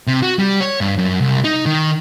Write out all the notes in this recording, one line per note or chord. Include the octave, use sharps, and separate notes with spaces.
C3
F#4
G3
C#5
G2
F#2
C2
D#4
D#3